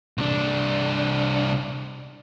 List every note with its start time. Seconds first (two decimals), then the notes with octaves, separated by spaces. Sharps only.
0.18 C2 D4